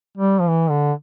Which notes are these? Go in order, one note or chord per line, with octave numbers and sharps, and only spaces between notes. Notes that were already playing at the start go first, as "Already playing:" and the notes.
G3
F3
E3
D3